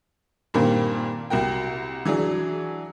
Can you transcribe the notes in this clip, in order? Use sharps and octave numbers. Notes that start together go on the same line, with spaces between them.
G2 A#2 D#3 A#3 C4 G4
C2 F#4 A#4 G5
E3 F#3 D4 G#4